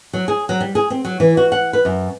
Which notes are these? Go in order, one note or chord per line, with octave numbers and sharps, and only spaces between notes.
F#3
G#4
F#3
G3
G#4
C4
F#3
E3
F#4
F#5
B4
F#2